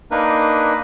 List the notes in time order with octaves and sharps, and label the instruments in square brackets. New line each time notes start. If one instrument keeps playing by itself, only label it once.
[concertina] A#3 D4 D#4 A#4 B4